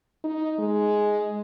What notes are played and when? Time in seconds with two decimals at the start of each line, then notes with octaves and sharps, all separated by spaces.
0.24 D#4
0.59 G#3